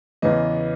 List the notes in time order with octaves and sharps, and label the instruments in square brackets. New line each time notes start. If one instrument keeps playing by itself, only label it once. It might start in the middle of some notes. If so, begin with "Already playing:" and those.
[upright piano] E2 C#3 E3 D#5